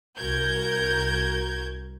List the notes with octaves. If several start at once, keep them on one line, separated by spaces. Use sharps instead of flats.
C2 F#4 A#4 G6 G#6